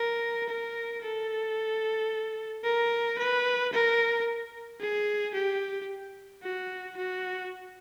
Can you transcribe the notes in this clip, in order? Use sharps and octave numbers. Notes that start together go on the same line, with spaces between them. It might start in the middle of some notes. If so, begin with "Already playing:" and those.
Already playing: A#4
A#4
A4
A#4
B4
A#4
G#4
G4
F#4
F#4